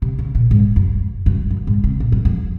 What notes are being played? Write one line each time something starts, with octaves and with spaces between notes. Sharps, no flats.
C3
C#3
A#2
G#2
F#2
F#2
F#2
G#2
C3
A#2
F#2
F2